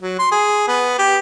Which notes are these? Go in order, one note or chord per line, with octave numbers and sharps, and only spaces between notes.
F#3
C6
G#4
B3
G4